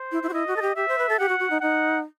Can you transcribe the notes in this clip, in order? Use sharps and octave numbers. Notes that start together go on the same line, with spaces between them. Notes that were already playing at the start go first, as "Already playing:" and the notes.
Already playing: C5
E4
E4
F#4
E4 D#5
F#4
A4
G4
G4 E5
C5
B4
A4
G4 F#5
F#4
F#4
D#4
D#4 F#5